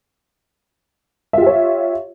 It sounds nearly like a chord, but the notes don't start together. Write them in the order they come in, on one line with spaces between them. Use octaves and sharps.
E5 F4 G4 C#5